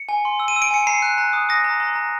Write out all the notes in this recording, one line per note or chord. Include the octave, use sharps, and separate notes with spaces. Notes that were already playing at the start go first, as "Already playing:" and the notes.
Already playing: C#7
G#5
C6
E6
D#7
E6
D7
G#5 C#7
A#5 C7
F#6
A#5
D#6
D#6 A#6
A#5
A#5
A#5